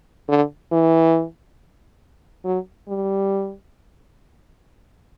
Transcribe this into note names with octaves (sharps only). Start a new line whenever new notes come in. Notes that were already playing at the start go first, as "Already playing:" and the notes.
D3
E3
F#3
G3